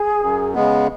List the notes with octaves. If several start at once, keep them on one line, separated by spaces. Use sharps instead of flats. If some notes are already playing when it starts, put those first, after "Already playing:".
Already playing: G#4
F#2
C#3 G#3 B3